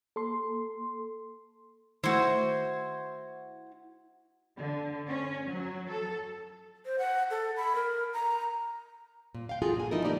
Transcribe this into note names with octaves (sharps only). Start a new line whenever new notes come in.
A#3 A4 C6
D#3 A3 E4 F#4 C5
D3
C#4
F#3
A4
C5
F#5
A4
B5
A#4
A#5
A#2
F5 G5
F4 F#4 G#4 A4
A#2 G#5
F3 D#4 E4 A4 A#4
D#3 A3 A#3 D#4 G4 D5